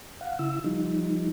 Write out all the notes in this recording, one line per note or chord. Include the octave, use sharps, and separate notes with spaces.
F5 F#5
C#3 E4 E6
F3 G3 D#4